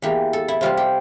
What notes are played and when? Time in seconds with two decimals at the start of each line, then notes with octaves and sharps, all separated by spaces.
0.02 E2 E3 A#3 G4
0.33 A4
0.48 E4
0.61 C3 G3 C4 F4
0.77 G4